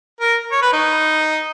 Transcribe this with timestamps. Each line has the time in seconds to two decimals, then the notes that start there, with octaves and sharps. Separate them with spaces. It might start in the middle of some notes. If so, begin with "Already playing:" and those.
0.20 A#4
0.52 C#5
0.62 B4
0.73 D#4